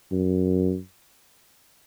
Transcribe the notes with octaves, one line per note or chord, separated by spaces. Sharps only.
F#2